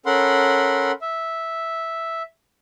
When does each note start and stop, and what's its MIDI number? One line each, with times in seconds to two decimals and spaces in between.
0.06 0.92 61
0.06 0.92 69
0.06 0.92 70
0.06 0.92 78
0.06 0.92 83
0.06 0.92 84
1.01 2.23 76